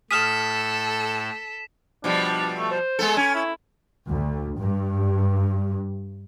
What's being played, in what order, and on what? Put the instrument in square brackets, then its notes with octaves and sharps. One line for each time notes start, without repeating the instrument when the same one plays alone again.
[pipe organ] A2 [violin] A4 [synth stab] D#6 F6 [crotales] B6 E7
[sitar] B2 F3 G3 [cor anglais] D4
[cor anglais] A3
C5
[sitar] G#3 B3 A4
[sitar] C#4 [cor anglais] G#5
[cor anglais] E4
[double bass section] D2
G2